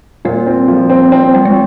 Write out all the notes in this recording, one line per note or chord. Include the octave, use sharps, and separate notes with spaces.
A#2 G3
C4
F3
C4
C4
G3 C4
G#3